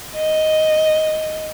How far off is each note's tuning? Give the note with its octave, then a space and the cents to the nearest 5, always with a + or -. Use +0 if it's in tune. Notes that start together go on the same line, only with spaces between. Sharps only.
D#5 +5